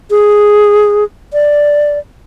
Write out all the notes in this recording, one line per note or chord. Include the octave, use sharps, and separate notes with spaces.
G#4
D5